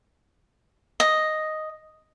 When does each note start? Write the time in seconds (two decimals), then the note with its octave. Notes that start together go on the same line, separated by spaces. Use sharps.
1.00 D#5